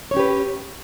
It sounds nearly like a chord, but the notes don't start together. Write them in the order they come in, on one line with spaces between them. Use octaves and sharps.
C#5 C#4 G4 B4